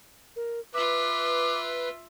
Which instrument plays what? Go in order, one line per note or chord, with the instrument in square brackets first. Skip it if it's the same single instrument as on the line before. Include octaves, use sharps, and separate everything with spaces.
[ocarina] A#4
[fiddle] F4 E5 [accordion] B4 [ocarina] D6